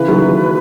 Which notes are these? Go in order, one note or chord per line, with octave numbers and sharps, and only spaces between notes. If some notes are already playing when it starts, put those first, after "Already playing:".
Already playing: C#3 E3 B4
D#3 F#3